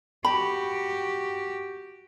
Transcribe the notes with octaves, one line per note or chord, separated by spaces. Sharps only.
F#4 G4 B5